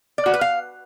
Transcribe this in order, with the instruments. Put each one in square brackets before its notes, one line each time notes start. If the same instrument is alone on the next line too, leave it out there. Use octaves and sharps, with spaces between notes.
[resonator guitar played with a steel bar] D5
F#4
B4
F5